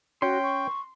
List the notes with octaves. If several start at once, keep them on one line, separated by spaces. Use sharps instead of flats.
C#4 F#4 G5 C6
C#6